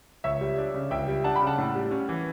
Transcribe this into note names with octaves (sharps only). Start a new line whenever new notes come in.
C#2 C#5 E5
G3
D4
C#3
C#2 E5 G5
G3
D4 F#5 A5
G5 B5
C#3
F#5 A5
A2
G3
C#4
E3